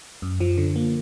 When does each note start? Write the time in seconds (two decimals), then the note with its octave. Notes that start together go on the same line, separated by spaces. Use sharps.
0.22 F#2
0.40 F3
0.58 D3
0.76 A#3